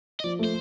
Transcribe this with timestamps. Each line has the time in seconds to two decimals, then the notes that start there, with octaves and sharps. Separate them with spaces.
0.20 D#5
0.24 F3 D5
0.39 A3 C5